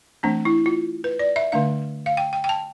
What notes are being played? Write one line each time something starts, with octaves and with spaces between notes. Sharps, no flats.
E3 A3 C4 D4
E4
F4
B4
D5
E5
D3 A3 D4 F5
F5
G5
G5
G5
A5